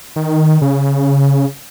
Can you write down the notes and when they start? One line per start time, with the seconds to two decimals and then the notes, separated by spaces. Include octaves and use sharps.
0.16 D#3
0.61 C#3